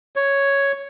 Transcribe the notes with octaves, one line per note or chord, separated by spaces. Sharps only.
C#5